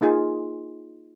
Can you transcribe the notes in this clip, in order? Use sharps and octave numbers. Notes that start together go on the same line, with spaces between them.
A#3 D#4 F4 G#4